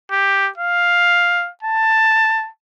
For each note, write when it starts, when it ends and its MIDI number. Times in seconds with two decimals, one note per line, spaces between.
0.11 0.49 67
0.58 1.49 77
1.63 2.48 81